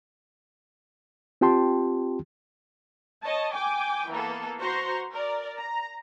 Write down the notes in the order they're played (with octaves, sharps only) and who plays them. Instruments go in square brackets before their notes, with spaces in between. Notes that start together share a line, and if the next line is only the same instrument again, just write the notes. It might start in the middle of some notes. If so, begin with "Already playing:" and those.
[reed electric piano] C4 F4 G4 G5 A5 C6
[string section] C#5 D#5 A5
G5 G#5 D6
E3 A#3 B3 A4
F#4 C5 A#5 C6 C#6
A#4 D5
A#5